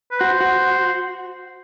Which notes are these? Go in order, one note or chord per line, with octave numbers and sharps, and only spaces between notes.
B4
F#4 C5
F#4